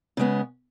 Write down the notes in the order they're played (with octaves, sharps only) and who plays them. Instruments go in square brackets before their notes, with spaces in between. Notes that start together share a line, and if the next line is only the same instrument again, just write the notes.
[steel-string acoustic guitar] C#3 G#3 B3